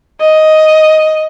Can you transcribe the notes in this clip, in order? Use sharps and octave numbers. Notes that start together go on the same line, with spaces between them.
D#5